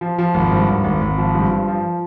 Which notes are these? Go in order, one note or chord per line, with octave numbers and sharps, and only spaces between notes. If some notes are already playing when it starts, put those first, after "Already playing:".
F3
F3
G#1
G2
G#1
G#1
G#1
F3
G2
F3
F3